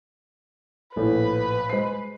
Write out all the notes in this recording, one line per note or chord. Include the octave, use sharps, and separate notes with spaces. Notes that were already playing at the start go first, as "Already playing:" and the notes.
A#1 A2 B4
G#3 C5 C7